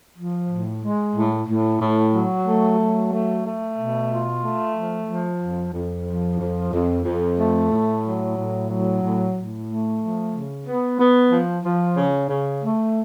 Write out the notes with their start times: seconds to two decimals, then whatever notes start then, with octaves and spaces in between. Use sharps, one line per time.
0.16 F3
0.50 A2
0.83 G#3
1.15 A2
1.48 A2
1.81 A2
2.14 F#3
2.46 A3
2.79 F#3
3.12 A3
3.45 A3
3.77 B2
4.10 F4
4.43 A3
4.76 F3
5.08 F3
5.42 F2
5.74 F2
6.07 F3
6.40 F2
6.72 F2
7.05 F2
7.38 A3
7.71 A2
8.04 F#3
8.36 A2
8.69 F#3
9.02 A2
9.35 A2
9.67 A3
10.00 F3
10.33 C#3
10.66 B3
10.99 B3
11.31 F3
11.64 F3
11.97 C#3
12.30 C#3
12.62 A3